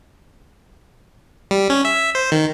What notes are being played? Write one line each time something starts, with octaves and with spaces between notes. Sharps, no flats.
G3
C#4
E5
C5
D#3